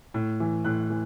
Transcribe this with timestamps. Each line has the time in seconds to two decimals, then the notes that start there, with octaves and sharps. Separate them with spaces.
0.14 A2
0.40 E3
0.65 A2 F#6
0.90 E3